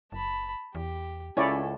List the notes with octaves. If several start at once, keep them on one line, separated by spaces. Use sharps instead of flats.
F#1 A5 B5
E2 G4
C#2 C#4 E4 A4 C#5 D5 G#5